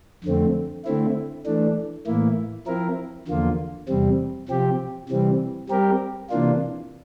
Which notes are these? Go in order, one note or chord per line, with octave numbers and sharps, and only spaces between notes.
F2 D3 A3 C4
D3 A3 C4 E4
E3 A3 D4
A2 E3 A#3 E4
F3 C4 E4 A#4
E2 D3 F3 A#3 F4
E2 C3 G3 C4
C3 F3 C4 G4
C3 E3 G3 C4
G3 C4 G4 A#4
C3 E3 A#3 D4 F4